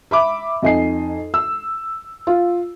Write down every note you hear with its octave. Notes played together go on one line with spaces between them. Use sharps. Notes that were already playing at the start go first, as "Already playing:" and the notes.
E5 B5 D6
F2 D#4 D#5 G#5 C7
E6
F4